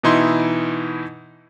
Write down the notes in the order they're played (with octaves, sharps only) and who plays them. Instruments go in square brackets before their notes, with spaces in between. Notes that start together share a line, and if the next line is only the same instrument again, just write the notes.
[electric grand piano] B2 E3 D#4 E4 C6